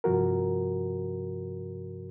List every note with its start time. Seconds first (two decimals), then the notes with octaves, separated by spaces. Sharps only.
0.04 G2 C3 F3 F#4 A#4